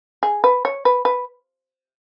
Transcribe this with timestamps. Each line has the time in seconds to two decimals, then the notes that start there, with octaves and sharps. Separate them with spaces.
0.23 G#4
0.44 B4
0.65 C#5
0.85 B4
1.05 B4